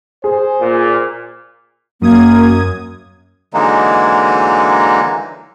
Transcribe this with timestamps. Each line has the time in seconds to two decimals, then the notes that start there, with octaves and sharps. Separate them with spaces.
0.24 G#4 C5
0.61 A#2
2.01 F#2 A#3 D#6 G#6
3.54 D3 E3 F#3 G#3 A#3 D#4